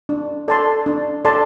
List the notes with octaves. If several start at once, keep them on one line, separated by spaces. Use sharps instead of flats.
D4
A4 D5 A5 C6
D4
A4 D5 A5 C6